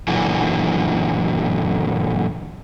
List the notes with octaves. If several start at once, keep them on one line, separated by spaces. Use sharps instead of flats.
F#2 A#2 D3 E3